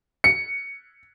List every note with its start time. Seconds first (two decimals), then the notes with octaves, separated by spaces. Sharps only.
0.24 C#7